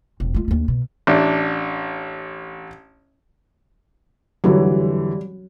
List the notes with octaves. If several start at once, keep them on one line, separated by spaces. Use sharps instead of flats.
E1 F2
G#3 F4
D#2 D4
B2
A1 D4
F1 D3 E3 F#3 G3